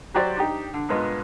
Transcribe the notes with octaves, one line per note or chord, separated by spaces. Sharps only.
F#3 F#4 G4 C5 D5
D4 D#4 G4
D3
G2 A#2 G#3 B3